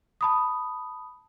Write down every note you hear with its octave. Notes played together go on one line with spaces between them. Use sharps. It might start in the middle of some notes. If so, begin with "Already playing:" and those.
A5 B5 D#6